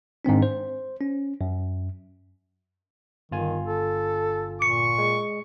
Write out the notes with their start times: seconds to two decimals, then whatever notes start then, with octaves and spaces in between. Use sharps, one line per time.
0.25 G#2 D#3 C4 D4
0.42 C5
1.01 C#4
1.41 F#2
3.32 G1 D#3 F4 G#5
3.67 A4
4.62 A#2 C#6 C#7
4.98 G#3